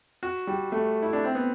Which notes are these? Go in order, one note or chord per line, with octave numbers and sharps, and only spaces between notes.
F#4
G3
A3
E4
D4
C4
B3